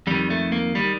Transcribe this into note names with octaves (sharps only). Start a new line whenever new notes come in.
F2 D#3 G3
A3
A#3
D#3 G3